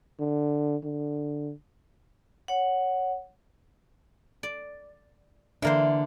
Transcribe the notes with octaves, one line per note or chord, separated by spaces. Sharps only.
D3
D3
C#5 F#5
D5
D3 E3 A#3 D4 C5